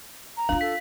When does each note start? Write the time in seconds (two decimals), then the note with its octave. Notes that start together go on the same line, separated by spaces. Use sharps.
0.37 A#5
0.49 D4 F4 F5
0.61 A4 B6